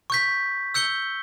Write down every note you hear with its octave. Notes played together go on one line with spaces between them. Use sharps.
C#6 G6 B6
E6 G6 C#7 G7